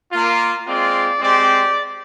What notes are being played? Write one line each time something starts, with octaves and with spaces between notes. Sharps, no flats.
A#3 F4
G#3 C4 F4 D5
G#3 C4 G4 D5